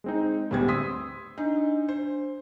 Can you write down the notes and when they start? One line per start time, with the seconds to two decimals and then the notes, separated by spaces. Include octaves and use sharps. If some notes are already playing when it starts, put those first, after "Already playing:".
0.04 G#3 C4 D#4
0.51 D2 A2 G3 B3 C4 G#6
0.68 C6 D#6 E6 B6
1.38 D4 D#4
1.89 C5